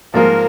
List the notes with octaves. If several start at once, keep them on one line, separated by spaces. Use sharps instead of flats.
G#2 F3 A#3 F4 G#4 A#4